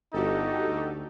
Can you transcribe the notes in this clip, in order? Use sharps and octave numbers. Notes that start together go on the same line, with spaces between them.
G1 D#4 F#4 G4 A4
D2